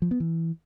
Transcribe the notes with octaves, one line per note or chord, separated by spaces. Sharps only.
F3
B3
E3